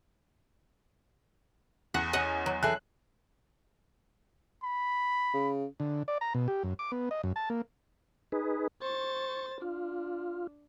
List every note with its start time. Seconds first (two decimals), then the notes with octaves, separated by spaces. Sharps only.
1.94 E2 F#5
2.13 C#4 D#5 F#5
2.46 F#3
2.63 E3 G#4 A4 F#6
4.64 B5
5.34 C#3
5.80 D3
6.08 D5
6.21 A#5
6.34 B2
6.48 G4
6.64 F#2
6.79 D6
6.92 B3
7.11 D#5
7.24 F#2
7.36 A5
7.50 A#3
8.32 D#4 G#4 B4
8.82 C5 C#6 A6
9.62 D4 F4